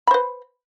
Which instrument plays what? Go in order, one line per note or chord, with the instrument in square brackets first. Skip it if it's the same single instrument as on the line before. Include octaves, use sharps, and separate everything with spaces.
[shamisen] B5
C5
B4